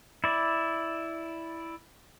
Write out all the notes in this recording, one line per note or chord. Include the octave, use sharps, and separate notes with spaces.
E4 D5